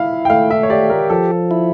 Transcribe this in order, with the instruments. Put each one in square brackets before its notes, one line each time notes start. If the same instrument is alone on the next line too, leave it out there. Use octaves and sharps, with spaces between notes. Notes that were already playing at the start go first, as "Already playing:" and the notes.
Already playing: [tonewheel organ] E4 [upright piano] F5
[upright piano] G5
[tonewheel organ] A3 [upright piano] F5
[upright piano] E5
C#5
[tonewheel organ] G4 [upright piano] D5
[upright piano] A#4
[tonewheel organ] F3 [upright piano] A4
[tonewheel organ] E4